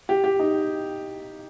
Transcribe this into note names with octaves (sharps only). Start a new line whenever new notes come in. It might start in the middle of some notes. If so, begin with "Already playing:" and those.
G4
G4
D#4